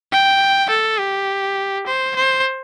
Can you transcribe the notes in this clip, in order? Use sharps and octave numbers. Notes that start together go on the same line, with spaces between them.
G5
A4
G4
C5
C5